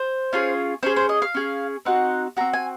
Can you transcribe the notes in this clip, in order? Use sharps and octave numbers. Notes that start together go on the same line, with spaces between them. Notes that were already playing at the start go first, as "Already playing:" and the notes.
Already playing: C5
C#4 F4 G#4
C#4 G#4 C5
C5
D#5
F5
C#4 G#4
C4 D#4 F#4 F#5
C4 F#4 A#5
G#5